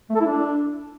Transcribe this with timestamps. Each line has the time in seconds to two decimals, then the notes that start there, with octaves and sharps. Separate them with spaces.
0.10 A3
0.15 A4
0.20 E4
0.26 D4